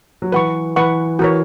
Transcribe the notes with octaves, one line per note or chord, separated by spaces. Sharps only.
F#3
E3 B4 F#5 C#6
E3 B4 F#5 C#6
E3 F#4 A#4 C#5